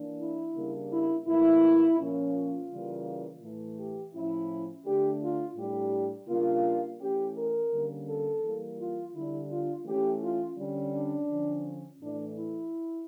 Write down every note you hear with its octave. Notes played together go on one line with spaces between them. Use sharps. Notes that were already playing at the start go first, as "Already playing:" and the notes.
Already playing: E3 A#3 D4
E4
C#3 G3 A#3 D4
E4
A2 E3 A#3 E4
A#2 F3 A#3 C#4
F4
C#3 E3 G3 A#3
A2 E3 A3
G4
A2 F3 C#4 E4
D3 A3 D4 G4
F4
A2 G3 D4 G4
C#3 G3 A#3 D4 F4
E3 A3 C#4 G4
A#4
D3 G3 A#3 C#4
A4
E3 G3 A#3
F4
D3 G3 D4 E4
F4
E3 A3 C#4 G4
F4
D3 G3 C#4
D4
D3 F3 C#4
A2 E3 A3 D4
E4